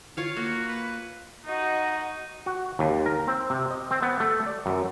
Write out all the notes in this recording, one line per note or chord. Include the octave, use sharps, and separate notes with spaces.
F4 C#5 F5
A#3 F#4
B4
D#4 F#4 D#5
F#4
D#2
A#4
C4
C3
D#5
C4
B3
A3
D5
F#2